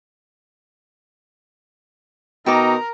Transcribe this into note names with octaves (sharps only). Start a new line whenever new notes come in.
B2 D#4 A#4 G5 A5 D6